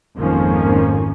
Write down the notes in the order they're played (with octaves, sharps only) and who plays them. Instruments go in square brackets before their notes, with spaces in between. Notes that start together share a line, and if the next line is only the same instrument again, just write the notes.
[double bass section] G#1 F2 D#3 F3 A#3 C#4